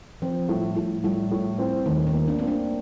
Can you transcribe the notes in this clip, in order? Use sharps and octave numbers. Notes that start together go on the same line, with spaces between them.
F3 C4
A2 G3
A2 A3
A2 G3
A2
C4
D#2 A3
C4
A#3
D4
A#3 C4
D4